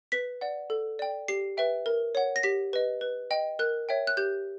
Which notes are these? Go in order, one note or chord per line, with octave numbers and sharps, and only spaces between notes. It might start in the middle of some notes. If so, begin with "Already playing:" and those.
B4 B6
D5 F#5
A4
D5 G5
G4 C7
B4 E5 G5
A#4
C#5 F#5
A#6
G4 B6
B4 D#5
B4
D#5 G5
A#4 F#6
C#5 E5 G5
F#6
G4 G6